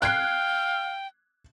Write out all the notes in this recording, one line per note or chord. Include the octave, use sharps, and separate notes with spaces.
F5 G5 F#6 G#6 C7